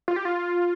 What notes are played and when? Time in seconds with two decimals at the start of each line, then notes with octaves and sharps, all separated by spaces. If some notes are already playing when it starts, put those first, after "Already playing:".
0.08 F4
0.16 G4
0.25 F4